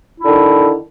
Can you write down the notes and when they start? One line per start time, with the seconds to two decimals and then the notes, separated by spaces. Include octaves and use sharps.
0.19 E4
0.23 D3
0.27 D#3